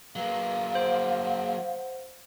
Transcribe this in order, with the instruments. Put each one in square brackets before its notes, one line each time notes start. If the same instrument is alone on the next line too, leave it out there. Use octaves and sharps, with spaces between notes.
[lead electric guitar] F#3 A#3 [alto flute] B4 [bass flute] F5
[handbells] C5 [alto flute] F#5